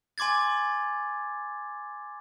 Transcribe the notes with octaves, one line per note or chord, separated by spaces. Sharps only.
G#5 C6 D6 G#6 A6